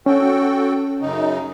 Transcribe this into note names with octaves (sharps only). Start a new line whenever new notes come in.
C#4 F#4 A4 G5
F#2 C#3 D#4